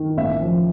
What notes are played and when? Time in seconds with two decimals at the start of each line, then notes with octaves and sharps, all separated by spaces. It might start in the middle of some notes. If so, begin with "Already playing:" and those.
Already playing: D#3
0.17 A1 E5
0.41 F3